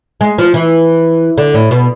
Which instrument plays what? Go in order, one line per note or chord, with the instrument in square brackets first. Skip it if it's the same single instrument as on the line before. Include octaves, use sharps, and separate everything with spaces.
[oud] G#3
F3
E3
D3
A2
B2